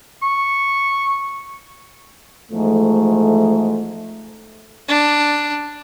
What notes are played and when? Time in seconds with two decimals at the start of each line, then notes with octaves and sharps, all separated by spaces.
0.22 C#6
2.51 E2 G#2 F3 A3
4.88 D4